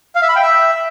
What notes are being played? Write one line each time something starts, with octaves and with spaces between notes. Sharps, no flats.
F5
E5
B5
G5
E5